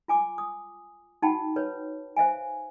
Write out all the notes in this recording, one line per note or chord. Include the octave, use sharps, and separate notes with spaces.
F4 G#5 D6
D#6
D#4 F#4 F#5 G5 A5 B5
B4 C#5
C5 E5 F5 G#5